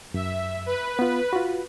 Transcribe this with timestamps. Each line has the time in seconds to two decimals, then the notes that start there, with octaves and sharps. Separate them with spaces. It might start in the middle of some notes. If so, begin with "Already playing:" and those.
0.14 F#2 E5
0.66 B4
0.99 B3 F4
1.33 F4 F#4